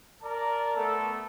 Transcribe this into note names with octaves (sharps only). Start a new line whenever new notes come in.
A#4 D5 A5 A#5
A3 B3 A4